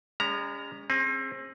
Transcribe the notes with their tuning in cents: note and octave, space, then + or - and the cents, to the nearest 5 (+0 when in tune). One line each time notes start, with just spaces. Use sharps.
G#3 -40 C#4 +30 A#5 +0
C4 +30 G#4 -10